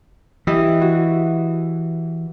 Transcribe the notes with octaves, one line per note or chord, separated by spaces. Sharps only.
E3 E4 G4 D#5
F#4